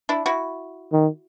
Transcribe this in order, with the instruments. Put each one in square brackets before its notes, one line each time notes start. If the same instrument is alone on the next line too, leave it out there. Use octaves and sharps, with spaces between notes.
[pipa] D4 E4
E4 F#4
[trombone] D#3